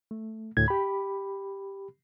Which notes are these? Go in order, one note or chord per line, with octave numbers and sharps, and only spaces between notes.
A3
D2 A2 G#6
G4 B5